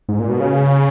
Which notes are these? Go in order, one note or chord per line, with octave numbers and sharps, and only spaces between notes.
G#2
A#2
B2
C#3